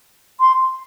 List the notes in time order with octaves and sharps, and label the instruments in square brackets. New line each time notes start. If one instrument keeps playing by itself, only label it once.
[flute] C6